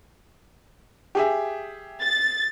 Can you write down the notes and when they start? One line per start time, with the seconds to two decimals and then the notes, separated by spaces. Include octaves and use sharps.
1.15 G4 G#4 E5
2.01 A6